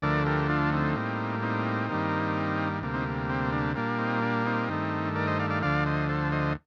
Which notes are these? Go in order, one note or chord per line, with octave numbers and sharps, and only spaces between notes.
D2 D3 F3 A3 A#4 D5
G4 A#4
D4 F4
C4 D#4
A2 G3 A#3
C4 D#4
G2 D#3 G3 A#3
D2 C3 G3 A#3
C4 D#4
C4
D4
A#2 G3 A#3 D4
C4 D#4
D4
C4 D#4
G2 D#3 A3
A#4 D5
C5 D#5
D5 F5
D5 F5
D2 D3 F3 D5 F5
C5 D#5
A4 C5
C5 D#5